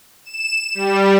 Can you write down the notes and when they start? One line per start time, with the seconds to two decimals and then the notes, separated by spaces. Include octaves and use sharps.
0.25 E7
0.75 G3